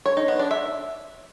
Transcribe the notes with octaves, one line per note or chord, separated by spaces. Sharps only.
C#5
D#4
B3
D4
E5